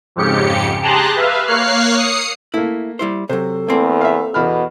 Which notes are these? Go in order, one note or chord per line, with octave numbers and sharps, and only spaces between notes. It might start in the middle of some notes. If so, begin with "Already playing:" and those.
F2 G#2 C#3 G4 C#7
G4 G#4 A5 A#5 C6 F#6
B4 E5 F5
A#3 C#5 F5 F6 F#6 C7
D#6 C7 C#7
A3 A#3 E4
G3 E4 C5
C3 F#3 A4 C5
E2 A3 A#3 C4
E5 F5
E2 B2 B5 F6